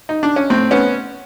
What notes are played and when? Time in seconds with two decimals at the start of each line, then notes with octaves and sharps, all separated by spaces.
0.09 D#4
0.23 D4
0.36 C#4
0.50 A2 C4
0.71 B3 C#4